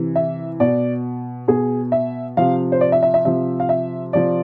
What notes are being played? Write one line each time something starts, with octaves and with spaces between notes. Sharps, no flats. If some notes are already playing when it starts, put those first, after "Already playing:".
Already playing: C3 E3
E5
B2 D5
B2 G#4
E5
C3 F3 F5
C5
D5
E5
E5
E5
C3 F3 E5
F5
E5
C3 F3 D5